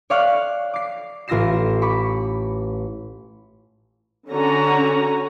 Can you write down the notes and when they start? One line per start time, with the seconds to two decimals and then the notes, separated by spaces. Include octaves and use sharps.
0.10 C#5 D5 F5 C#6 F6 F#6
0.74 D6 C7
1.28 A1 F4 E6 A#6 C7 E7
1.82 B5 C#6 D6
4.30 D3 C#4 F#4 A#5